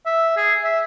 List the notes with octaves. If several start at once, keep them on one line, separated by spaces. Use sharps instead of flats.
E5
G#4
E5